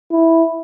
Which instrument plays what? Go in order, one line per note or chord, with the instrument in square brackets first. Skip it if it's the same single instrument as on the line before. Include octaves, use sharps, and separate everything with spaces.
[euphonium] E4